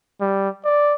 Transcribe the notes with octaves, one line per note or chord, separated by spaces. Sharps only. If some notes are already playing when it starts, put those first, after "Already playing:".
G3
D5